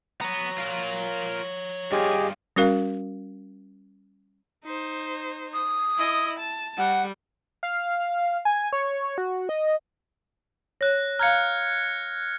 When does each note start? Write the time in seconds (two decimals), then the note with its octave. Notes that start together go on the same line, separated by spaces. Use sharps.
0.21 B3 C#5 A#5
0.58 F4 A#4
1.92 G2 F4 G4 G#4 D#5
2.56 G3 C#4 F#4 A#4 F5
4.64 D#4 C5
5.53 D#6
5.98 E4 D#5
6.39 A5
6.77 G3 F#5
7.63 F5
8.45 G#5
8.73 C#5
9.18 F#4
9.49 D#5
10.81 C#5 F#6 A#6
11.19 F5 A#5 F6 G#6 C#7